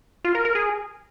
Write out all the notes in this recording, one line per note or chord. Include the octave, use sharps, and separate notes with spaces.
F4
A#4
A#4
G#4